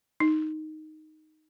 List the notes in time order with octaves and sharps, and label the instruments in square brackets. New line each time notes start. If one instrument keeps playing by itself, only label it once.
[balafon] D#4